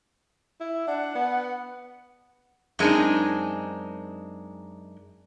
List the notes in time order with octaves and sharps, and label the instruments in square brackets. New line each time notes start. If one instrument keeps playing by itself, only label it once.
[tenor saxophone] E4
[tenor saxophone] D4 [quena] F#5
[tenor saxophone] B3
[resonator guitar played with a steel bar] F#2 G#3 C4 D4 D#4